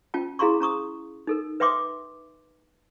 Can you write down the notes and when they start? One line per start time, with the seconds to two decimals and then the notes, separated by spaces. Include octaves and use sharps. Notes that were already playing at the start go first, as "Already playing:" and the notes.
0.14 C#4 F4 G5 A5
0.39 E4 G#4 F5 A#5 C6 C#6
0.61 C#4 A#5 C#6 D#6
1.27 D#4 A4 A#4
1.60 B4 E5 G5 C6 D6 D#6